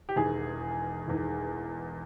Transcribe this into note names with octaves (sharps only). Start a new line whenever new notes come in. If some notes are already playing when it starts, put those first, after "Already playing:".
G4
E1 E2 D#3 G#4
E1 E2 D#3